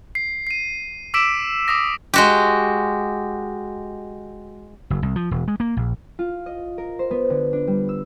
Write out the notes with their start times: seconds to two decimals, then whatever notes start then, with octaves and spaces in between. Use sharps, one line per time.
0.15 C7
0.47 C7 D#7
1.14 D6 E6 B6 D7 E7
1.68 D6 D#6 A#6
2.14 G#3 F#4 G4
4.90 F#1
5.02 C2
5.16 F3
5.31 E1
5.48 G#3
5.60 A#3
5.77 A#1
6.19 F4
6.46 D#5
6.78 A#4
6.99 C5
7.11 B3
7.30 D3
7.53 D4
7.67 G3
7.89 E6